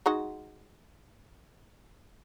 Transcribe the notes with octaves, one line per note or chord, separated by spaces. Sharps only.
G#3 D#4 F#4